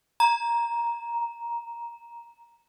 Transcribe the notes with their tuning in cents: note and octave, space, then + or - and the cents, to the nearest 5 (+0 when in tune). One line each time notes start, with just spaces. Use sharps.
A#5 +10